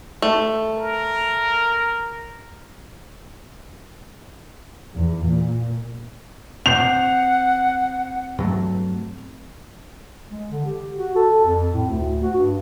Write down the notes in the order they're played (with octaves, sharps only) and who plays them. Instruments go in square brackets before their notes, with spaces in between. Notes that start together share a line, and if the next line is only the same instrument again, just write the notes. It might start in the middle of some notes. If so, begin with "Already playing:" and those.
[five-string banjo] A3
[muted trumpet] A#4
[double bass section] E2
A#2
[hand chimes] C4 G6 C7 [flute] F#5 [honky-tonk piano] F7
[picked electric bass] G2 F#3 A3
[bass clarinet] G#3
D3
G4
F#4
A4
F2
A2
D2
F#4
G2